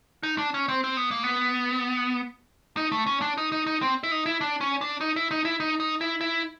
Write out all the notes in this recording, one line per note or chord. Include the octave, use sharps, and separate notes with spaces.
D#4
D4
C#4
C4
C4
B3
A#3
B3
D#4
A3
C#4
D4
D#4
D#4
D#4
C4
E4
D#4
E4
D4
C#4
D4
D#4
E4
D#4
E4
D#4
D#4
E4
E4